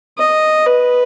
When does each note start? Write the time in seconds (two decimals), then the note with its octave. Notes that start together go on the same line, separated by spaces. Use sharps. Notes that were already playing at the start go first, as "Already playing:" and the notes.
0.18 D#5
0.67 B4